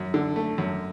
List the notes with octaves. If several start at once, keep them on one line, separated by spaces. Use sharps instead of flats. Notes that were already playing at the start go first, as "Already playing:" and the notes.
Already playing: F#2
D3
A3
F#2